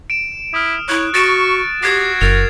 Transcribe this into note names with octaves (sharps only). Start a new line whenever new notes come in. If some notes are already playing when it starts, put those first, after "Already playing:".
D7 E7
E4 D#6 F6
E4 C#5 F#6
F#4 C#6 A6 D7 E7
F#4 G4 G#6 C7
F#1 A#4 A6 F7